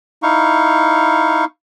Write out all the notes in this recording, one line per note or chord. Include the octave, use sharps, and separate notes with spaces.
D#4 E4 F5 C#6